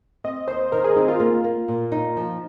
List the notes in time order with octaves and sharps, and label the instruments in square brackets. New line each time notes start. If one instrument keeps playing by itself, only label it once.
[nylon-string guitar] C4 [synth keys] D#5
[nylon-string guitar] D#2 [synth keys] C5
[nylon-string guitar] D#3 [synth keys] A#4
[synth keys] G#4
[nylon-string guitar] C4 [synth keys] D#4
[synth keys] F4
[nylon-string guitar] A#3 [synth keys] F4
[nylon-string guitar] A#3
A#2
D#4
F3